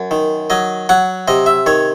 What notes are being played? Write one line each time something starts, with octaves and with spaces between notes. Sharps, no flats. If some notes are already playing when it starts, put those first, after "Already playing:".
Already playing: F#2
D#3
F#3 D#5
F#3 F#5
C3 D#5
E5
D#3 C#5